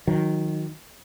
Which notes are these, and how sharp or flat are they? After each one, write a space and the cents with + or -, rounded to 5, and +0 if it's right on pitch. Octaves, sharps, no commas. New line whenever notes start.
D#3 +0 F#3 -30